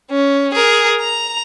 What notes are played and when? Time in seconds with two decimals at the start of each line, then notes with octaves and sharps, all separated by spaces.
0.10 C#4
0.53 G#4 A#4
1.00 A#5 F7